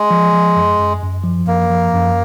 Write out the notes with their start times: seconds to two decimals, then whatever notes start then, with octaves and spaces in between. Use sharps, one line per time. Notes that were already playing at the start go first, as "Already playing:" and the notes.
Already playing: G#3
0.11 F3
0.33 F3
0.56 F#2
0.79 F#2
1.02 F#2
1.24 F3
1.47 F#2 A#3
1.70 F3
1.93 F#2